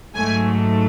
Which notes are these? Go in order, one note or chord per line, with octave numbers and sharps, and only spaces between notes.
G#2 F#3 A3 G#5